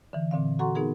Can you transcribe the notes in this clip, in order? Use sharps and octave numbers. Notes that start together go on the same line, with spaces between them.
D3 E3
A#2 D3 C4 F5
F#4 A4 F#5 A#5 C6 C#6
B3 D#4 G#4 A#4